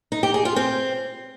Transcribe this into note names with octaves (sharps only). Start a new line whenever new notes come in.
D#4
G4
G#4
F4
C4